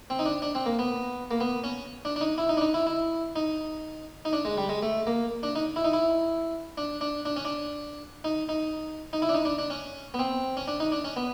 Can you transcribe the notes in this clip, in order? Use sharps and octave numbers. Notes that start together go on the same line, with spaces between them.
C4
D#4
D4
D4
C4
A#3
B3
A#3
B3
C#4
D4
D4
D#4
E4
D#4
D4
D#4
E4
E4
D#4
D#4
D4
G#3
G3
G#3
A3
A#3
D4
D#4
E4
D#4
E4
D4
D4
D4
C#4
D4
D#4
D#4
D#4
E4
D4
D#4
D4
D4
C#4
B3
C4
C#4
D4
D#4
D4
C#4
B3